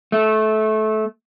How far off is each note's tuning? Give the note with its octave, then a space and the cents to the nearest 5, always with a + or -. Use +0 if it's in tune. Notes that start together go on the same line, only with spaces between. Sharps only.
A3 -20